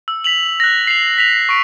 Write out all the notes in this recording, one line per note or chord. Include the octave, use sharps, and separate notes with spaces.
E6
B6 F7 F#7
F#6 A#6
C7 F7
B6 F7
C#6 D7